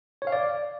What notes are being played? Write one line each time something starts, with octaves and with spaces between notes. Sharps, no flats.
C#5
F5
D5